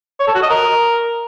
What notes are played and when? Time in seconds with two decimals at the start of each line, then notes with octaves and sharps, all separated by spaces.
0.20 C#5
0.27 A4
0.35 F#4
0.42 D#5
0.50 A#4